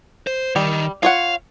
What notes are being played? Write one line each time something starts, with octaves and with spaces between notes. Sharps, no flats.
C5
D#3 G3
F4 C#5 F5 F#5